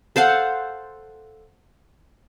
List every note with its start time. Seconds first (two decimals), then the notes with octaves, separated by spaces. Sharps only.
0.16 A4 C5 F5 F#5